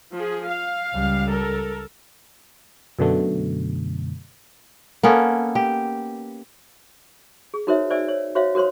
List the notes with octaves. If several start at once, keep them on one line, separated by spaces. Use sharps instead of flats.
F3 G#4
F5
C#2 G3
A4 A#4
F#2 B2 D3 A3
A#3 B3 C#4 A4
G4
G#4
D#4 F#4 A#4 C5 C#5 E5
C5 D5 E5 G#5 E6
C#5
F#4 C5 C#5 E5 F5
F#4 A#4 C5 C#5 C6